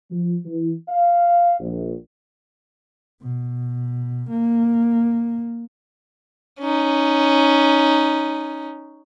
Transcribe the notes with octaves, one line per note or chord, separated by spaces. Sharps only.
F3
E3
F5
A#1
B2
A#3
C#4 D#4